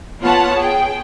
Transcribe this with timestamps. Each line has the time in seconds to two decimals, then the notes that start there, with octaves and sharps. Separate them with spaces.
0.21 B3 F4 C#5 F#5 A5
0.57 G#4 G5